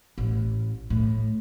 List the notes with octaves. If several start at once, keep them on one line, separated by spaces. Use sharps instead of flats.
A1
A2